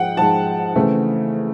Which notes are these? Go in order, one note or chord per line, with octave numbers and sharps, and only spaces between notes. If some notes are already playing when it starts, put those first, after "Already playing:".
Already playing: G#2 F3 G#3 F#5 G5
G#2 F3 G#3 A5
C#3 E3 A3 C4